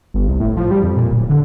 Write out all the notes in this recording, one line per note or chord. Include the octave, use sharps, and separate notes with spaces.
G1
C2
A2
F3
G3
F2
A#2
D1
D3